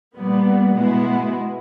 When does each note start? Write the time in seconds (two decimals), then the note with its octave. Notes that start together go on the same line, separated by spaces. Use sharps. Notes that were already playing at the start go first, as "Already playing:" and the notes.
0.17 A#2 G3 B3
0.75 B2 G#3 B3 E4